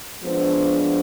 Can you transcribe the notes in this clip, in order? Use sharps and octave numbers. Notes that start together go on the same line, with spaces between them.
F3 G#3 B3 D4 C5